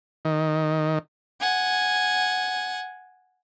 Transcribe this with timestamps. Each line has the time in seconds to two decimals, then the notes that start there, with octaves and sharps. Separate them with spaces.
0.25 D#3
1.40 F#5 G#5